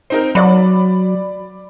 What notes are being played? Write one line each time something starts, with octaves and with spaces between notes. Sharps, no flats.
C4 D#4 A#4
F#3 D5 B5